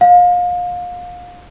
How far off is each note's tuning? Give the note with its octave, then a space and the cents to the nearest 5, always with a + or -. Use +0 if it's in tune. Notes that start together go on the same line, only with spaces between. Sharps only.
F5 +30